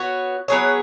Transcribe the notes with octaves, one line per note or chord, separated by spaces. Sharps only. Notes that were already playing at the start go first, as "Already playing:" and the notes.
Already playing: B3 F#4 C#5
F#3 B3 G#4 C#5